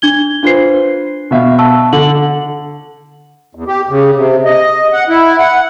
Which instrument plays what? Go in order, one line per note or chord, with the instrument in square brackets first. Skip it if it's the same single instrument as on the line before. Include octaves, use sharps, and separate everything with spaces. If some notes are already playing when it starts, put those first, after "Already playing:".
[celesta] D4 G#6 G7
[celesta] D4 C7 [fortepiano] F4 B4 C5
[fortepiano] B2 E5 F5
[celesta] A5 C#6 E6
[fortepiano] D3 [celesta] F#7
[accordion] E2
G4
C#3
C3
D#5
F#5
E4
F#5